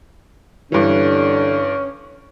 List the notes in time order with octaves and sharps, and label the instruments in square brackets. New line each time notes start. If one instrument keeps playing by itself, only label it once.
[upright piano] G2 E3 [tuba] D3 [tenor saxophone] C#4